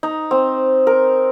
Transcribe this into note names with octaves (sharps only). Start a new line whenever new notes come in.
D#4
C4
A#4